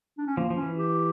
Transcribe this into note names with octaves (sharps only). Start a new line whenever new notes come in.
D4
C#4
F3 A#3
F3
C#4
E3
G4